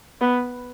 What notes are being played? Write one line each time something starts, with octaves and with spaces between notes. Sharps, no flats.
B3